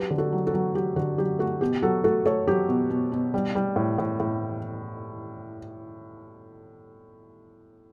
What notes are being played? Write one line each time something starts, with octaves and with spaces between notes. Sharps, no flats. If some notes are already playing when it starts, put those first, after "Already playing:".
Already playing: F#3 G4 B4
D3
F#4 A4
F#3
F#4 A4
F#3
F#3 G4
D3 F#4
F#3 G4
A3 F#4
B2 G4
F#3 F#4 A4
A3 F#4 A4
A3 A4 C#5
F#3 G4
B2
B2
B2
G3
G3
A2
A2
A2